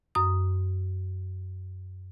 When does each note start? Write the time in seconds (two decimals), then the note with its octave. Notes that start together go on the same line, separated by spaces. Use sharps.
0.15 F#2 D#6